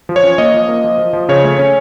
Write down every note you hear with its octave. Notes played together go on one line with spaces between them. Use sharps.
F3
C#5
C#4
A#3 D#5
F3
A#3
F3
F3
F3
C#3 C#5
A3
C#4